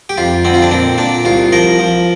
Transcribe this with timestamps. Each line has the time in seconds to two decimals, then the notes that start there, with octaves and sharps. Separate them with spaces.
0.09 G4
0.18 F2 F4
0.45 D3 C4
0.54 F4
0.62 D4
0.71 A#2 C4
0.98 A#2 D4
1.25 C2 F4
1.52 F3 A#4
1.79 F3